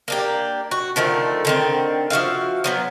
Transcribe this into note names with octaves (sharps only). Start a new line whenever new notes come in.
A#3 D4 G4
F#4
D3 D#3 F3 A3
D3 D#3 C4
F3 F#4 E5 F5
F3 F#3 B3